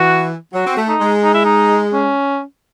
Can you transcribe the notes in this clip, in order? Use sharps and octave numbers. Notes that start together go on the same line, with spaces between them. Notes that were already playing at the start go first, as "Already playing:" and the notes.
Already playing: E3 F#4
F#3 F#4
C4
A3
D#4
G#3
D#4
E4
D#4
C#4